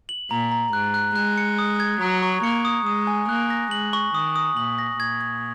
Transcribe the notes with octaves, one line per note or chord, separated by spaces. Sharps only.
F#7
A#2 A#5
A#5
G#2 F#6
F#6
G#3 F#6
C#7
D#6
G#6
F#3 A#5
C#6
A#3 C#7
D#6
G#3 D#6
G#5
A#3 F#6
A#6
G#3 F#7
C#6
D#3 D#6
D#6
A#2 F#7
A#6
A#2 G#6
G#6